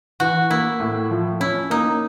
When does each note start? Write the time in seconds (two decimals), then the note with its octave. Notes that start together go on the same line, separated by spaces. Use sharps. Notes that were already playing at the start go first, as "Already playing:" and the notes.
0.20 E3 F#4
0.50 A#3 E4
0.80 A2
1.10 F3
1.40 C#4 E4
1.70 A#3 D#4